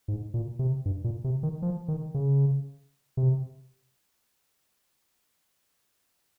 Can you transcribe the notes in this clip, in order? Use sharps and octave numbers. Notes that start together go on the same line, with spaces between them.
G#2
A#2
C3
G2
A#2
C3
D#3
F3
D#3
C#3
C3